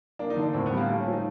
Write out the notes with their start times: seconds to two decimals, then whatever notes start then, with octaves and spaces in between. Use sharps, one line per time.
0.19 A#3 D4
0.30 D#4
0.36 D3
0.42 D4
0.53 A2 C4
0.66 B3
0.71 G3
0.77 A#3
0.88 A3 A#3
1.00 C#4
1.07 F3
1.13 D#4